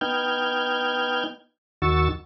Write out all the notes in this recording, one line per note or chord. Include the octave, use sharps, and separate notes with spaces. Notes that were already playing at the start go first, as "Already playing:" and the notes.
B3 D#4 G5 F6 G6 G#6
D#2 D#3 F#4 C#6 E6 A6